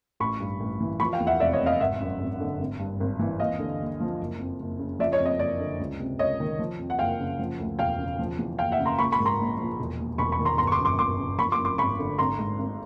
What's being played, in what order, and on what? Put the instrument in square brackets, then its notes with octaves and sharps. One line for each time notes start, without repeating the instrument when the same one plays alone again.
[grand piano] A1 B5 C#6
G2
A1
E3
F3 B5 C#6
F5 G5
E2
E5 F#5
F1 D5 E5
C#5 D#5
C3
D#5 F5
G#1 E5 F#5
F#2
G#1
D3
G#1
G2
G#1
E3
D#2 D#5 F5
D3
D#2
F3
F#1
F2
F#1
C#3
F3 D5 E5
C#5 D#5
F2
C#5 D#5
F#1 D5
D3
C#2
C3
C#2 C#5 D#5
D#3
F3
F2
F#5
F#1 F5 G5
C#3
F3
D2
E1 F5 G5
C#3
F3
E2
F#1 F5 G5
E5 F#5
C#3
A#5 C6
A#1 B5 C#6
B5 C#6
G#2
A#5 C6
A#1
F3
E1
D#2
E1 B5 C#6
B5 C#6
D#3
A#5 C6
G1 A#5 C6
C#6
C6 D6
F#2
C6 D6
G1 C6 D6
C#3
F3 B5 C#6
C6 D6
F#2
C6 D6
G#1 B5 C#6
D3
G#1 A#5 C6
G#2
G#1